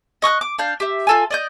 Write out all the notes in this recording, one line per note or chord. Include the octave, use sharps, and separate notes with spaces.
D#5 C#6 D#6 F#6
D6
D4 F5 G6
G4 E5
F4 A4 G#5
D5 D#5 G6